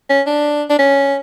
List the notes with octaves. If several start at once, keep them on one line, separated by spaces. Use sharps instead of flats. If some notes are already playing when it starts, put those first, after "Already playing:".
C#4
D4
D4
C#4